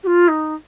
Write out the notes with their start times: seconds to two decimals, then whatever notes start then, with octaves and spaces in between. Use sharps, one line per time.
0.03 G4
0.07 F4
0.28 D#4